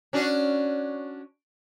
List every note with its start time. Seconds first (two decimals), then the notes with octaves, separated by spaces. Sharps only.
0.13 C#4 D4 F#4